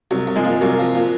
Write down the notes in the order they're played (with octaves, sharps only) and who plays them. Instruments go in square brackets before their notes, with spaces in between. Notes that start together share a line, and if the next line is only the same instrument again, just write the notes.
[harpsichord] C2 [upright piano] F#3
[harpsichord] C2
[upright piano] F3 G#3
[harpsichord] A#2
[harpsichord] C2 [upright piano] F#3 A#3
[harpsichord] F3
A#2